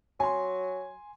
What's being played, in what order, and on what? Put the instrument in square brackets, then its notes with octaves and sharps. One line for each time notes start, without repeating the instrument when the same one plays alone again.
[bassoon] F#3 [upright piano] G#5 C6